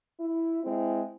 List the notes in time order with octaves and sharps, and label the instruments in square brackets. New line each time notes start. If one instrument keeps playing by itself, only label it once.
[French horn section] E4
G#3 C4 E4